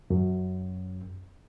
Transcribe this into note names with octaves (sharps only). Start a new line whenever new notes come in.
F#2